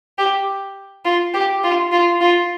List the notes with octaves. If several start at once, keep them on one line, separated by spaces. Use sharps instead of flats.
G4
F4
G4
F4
F4
F4